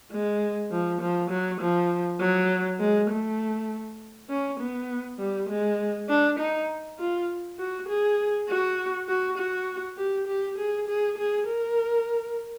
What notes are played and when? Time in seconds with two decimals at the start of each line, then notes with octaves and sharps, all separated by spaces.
0.11 G#3
0.71 F3
1.01 F3
1.30 F#3
1.61 F3
2.20 F#3
2.80 G#3
3.10 A3
4.30 C#4
4.60 B3
5.19 G3
5.49 G#3
6.09 D4
6.39 D#4
6.99 F4
7.59 F#4
7.88 G#4
8.49 F#4
9.08 F#4
9.38 F#4
9.97 G4
10.27 G4
10.58 G#4
10.88 G#4
11.18 G#4
11.47 A#4